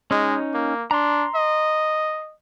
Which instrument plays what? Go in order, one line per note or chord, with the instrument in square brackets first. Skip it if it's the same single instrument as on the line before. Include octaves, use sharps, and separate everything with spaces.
[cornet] G#3 [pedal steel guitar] C#4 D#4
[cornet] A#3
[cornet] D4 [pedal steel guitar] A#5 C6
[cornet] D#5